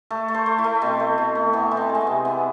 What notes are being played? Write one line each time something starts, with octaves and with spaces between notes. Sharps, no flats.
A3 A4
A3
C5
A3
E4
A3
B2 C4
A3
B2
A3
E3 B3
E3
C4
G#3
C4
B3
C3
E3 B3